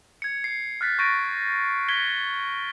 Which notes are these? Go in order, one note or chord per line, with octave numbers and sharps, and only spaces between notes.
G#6 C#7
C7 C#7
F6 F#6 A6 B6
C#6 G6 A6 A#6 D7 D#7
G#6 B6 C#7 G7